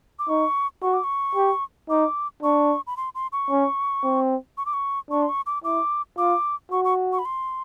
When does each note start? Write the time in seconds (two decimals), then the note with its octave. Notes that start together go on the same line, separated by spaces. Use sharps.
0.19 D6
0.29 D#4 C#6
0.82 F#4 C#6
0.93 D6
1.04 C#6
1.35 G4
1.89 D#4 D6
2.43 D4 C#6
2.87 B5
2.97 C6
3.15 C6
3.32 C#6
3.50 C#4
4.04 C4
4.57 C#6
4.66 D6
4.73 C#6
5.10 D4 C#6
5.22 C6
5.29 C#6
5.46 D6
5.64 E4 D6
6.18 F4 D6
6.72 F#4 C#6
6.85 C#6
7.13 C#6
7.19 B5
7.25 C6